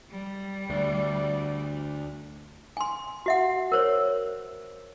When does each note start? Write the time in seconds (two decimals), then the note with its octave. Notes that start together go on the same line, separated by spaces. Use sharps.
0.11 G3
0.70 D2 D5
2.77 G#5 C6
3.26 F#4 E5 F#5
3.72 A#4 C5 C#5